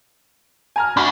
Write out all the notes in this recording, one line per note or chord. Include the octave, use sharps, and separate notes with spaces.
G#5 A#5 F6
D4 F#4 B5